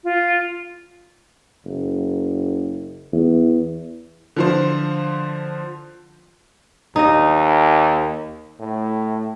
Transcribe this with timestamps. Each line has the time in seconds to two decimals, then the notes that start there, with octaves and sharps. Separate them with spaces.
0.04 F4
1.65 F#1
3.12 E2
4.36 D3 F3 C5
6.96 D#2 D#4 D#5
8.59 A2